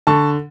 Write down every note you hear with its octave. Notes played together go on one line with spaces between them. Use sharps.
D3 A5 C#6